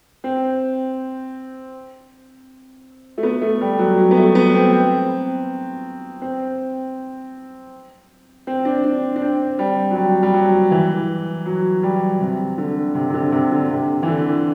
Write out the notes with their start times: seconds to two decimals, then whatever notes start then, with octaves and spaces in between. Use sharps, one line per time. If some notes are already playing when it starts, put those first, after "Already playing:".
0.24 C4
3.18 A3
3.23 B3
3.41 A3
3.61 G3
3.79 F#3
3.98 F#3
4.11 B3
4.17 A3
4.35 B3
4.54 C4
4.72 C4
6.22 C4
8.47 C4
8.65 D4
8.84 D4
9.16 D4
9.22 C4
9.59 G3
9.91 F#3
9.96 G3
10.23 G3
10.34 F#3
10.71 E3
11.45 F#3
11.83 G3
12.21 C3
12.58 D3
12.95 C3
13.10 C3
13.14 D3
13.32 C3
13.52 D3
13.70 C3
14.02 E3
14.07 D3